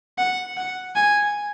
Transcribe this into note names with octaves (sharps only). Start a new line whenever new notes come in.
F#5
F#5
G#5